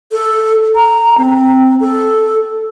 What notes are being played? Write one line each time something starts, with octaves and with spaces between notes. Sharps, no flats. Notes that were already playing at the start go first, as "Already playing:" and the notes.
A4
A#5
C4
A4